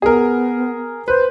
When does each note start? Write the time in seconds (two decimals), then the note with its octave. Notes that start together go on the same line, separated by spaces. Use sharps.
0.02 B3 G#4 A#4
1.08 B4 C5